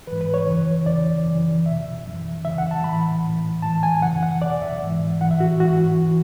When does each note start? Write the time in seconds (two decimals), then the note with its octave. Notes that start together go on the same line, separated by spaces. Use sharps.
0.07 G#2 E3 B4
0.21 B4
0.34 C#5
0.47 F#2 C#3 E3
0.86 E2 C#3 E3 D5
1.26 F#2 C#3 E3
1.65 E2 B2 E5
2.05 F#2 E3
2.44 E2 C#3 E3 E5
2.58 F#5
2.71 A5
2.84 A2 E3 B5
3.23 A2 E3
3.62 A2 E3 A5
3.83 G#5
4.02 F#2 C#3 E3 F#5
4.23 F#5
4.42 E2 B2 D5
4.62 E5
4.82 G#2 E3
5.21 A2 E3 F#5
5.31 E5
5.40 F#4
5.60 G#2 E3 F#4
6.01 E3